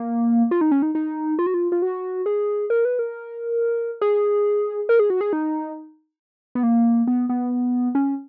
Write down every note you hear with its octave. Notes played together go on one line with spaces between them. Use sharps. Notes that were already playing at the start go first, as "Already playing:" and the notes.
Already playing: A#3
F4
D#4
C#4
D#4
D#4
F4
F#4
F4
F4
F#4
G#4
A#4
B4
A#4
G#4
A#4
G#4
F#4
G#4
D#4
B3
A#3
B3
B3
C#4